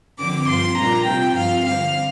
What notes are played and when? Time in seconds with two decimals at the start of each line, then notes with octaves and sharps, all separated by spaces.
0.18 D3 F3 C4 D6
0.47 G2 F3 C4 F4 C6
0.77 A#2 G3 A#3 D4 F4 A#5
1.06 C3 G3 C4 F4 G5
1.35 G2 F3 C4 F4 F5
1.64 D3 G3 C4 F5